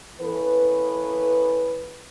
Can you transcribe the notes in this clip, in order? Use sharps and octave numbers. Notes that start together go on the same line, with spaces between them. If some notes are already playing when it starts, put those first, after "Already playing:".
E3 A#3 B3 C#4 A4 B4